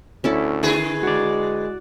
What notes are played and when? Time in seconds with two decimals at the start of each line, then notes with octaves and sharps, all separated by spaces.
0.24 D2 C#4 E4 A4
0.63 D3 E4 G#4 B4
1.03 G#3 F#4 D5